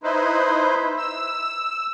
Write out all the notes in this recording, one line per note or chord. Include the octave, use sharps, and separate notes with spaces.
D#4 E4 B4 C5
E6